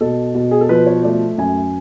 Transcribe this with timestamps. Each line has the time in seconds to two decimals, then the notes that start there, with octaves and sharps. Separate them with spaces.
0.01 B2 A4
0.35 B2
0.51 G#4
0.61 A4
0.69 F3 B4
0.87 C#5
1.03 A3 D5
1.38 F#2 G#5